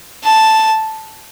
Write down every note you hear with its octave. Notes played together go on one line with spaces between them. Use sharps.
A5